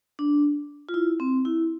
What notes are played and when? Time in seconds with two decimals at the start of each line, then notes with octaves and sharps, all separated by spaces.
0.19 D4
0.89 F4
0.94 E4
1.20 C4
1.45 E4